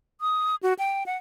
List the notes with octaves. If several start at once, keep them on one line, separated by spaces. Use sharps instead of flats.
D#6
F#4
G5
F#5